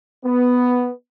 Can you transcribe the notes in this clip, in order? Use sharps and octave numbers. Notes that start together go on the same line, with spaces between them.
B3